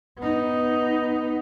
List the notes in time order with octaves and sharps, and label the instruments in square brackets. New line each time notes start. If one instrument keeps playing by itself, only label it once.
[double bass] B3 D#4